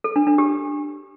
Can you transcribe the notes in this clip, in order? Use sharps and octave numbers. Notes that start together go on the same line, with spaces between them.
A4
D4
D4
G4